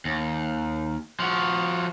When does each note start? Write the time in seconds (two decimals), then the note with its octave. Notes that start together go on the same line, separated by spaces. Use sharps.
0.05 D#2
1.20 F3 F#4